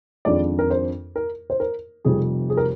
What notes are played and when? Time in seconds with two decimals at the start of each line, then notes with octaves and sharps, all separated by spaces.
0.25 F2 D#3 G#3 D4 F4 D5
0.59 A#4
0.70 C5
1.16 A#4
1.50 C5
1.60 A#4
2.05 F1 F2 C3 G3 G#4
2.50 G#4
2.57 A#4